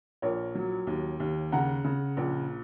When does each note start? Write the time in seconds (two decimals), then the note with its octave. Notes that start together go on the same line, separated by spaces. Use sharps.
0.22 A#1 A#4 C#5
0.55 F#3
0.87 D#2
1.20 D#2
1.52 C#3 F#5 A#5
1.84 C#3
2.17 A#1